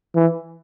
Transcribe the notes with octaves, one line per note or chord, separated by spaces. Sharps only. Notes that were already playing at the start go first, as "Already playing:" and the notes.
E3